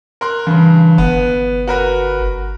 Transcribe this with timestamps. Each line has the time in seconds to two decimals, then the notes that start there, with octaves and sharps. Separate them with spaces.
0.21 A#4 C6 F#6
0.47 G2 C#3 E3
0.98 G1 B3
1.68 F#4 A#4 B4